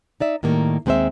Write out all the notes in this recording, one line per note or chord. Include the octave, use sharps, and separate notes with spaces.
D#4 D5 E5
A2 D#3 G3 A#3
D#2 G#3 C4 B4 C5 E5